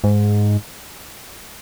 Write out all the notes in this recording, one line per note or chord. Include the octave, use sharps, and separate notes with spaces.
G#2